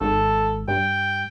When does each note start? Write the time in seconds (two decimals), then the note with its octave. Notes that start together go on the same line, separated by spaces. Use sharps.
0.01 G#1 A4
0.68 G2 G5